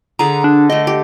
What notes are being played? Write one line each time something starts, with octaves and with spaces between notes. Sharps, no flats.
D3 G#4 B4 A#5
D4
A3 D#5 G5
G4